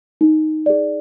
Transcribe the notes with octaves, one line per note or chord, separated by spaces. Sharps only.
D#4
G#4 D5